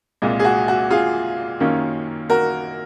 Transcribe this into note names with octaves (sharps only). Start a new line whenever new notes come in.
C2 A#2 G#3
G#4
F#4
F#4
F4 G#4
F#2 D#3 A#3 C#4
F#4 A#4